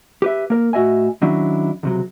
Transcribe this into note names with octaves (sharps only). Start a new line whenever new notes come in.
G4 B4 E5
A#3 A#4
A2 F#4 G4 D#5 E5 G#5
D#3 F#3 C#4 D4 E4
C#2 C3 F#3